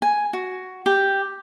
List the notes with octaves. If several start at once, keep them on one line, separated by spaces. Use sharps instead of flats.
G#5
F#4
G4